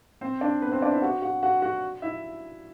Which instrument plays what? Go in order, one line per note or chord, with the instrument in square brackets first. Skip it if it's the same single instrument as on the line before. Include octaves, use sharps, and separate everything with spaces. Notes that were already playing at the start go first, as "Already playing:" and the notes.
[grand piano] C4 C5
D4 D5
B3 B4
C4 C5
D4 D5
E4 E5
F#4 F#5
F#4 F#5
F#4 F#5
F#4 F#5
E4 E5